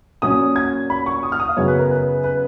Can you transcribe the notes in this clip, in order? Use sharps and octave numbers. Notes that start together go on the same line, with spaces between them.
A#2 F#3 C#4 D#6
G#6
B5
C#6
D#6
F6
D#6
F5
F#2 C#3 F#3 B3 C#5
B4
A#4
B4
B4